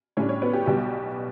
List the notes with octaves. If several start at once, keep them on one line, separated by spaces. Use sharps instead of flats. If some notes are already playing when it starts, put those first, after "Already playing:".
A2 G3 C#4 D4 C#5
C#4 C#5
B3 B4
G4
B1 B2 G3 B3 G4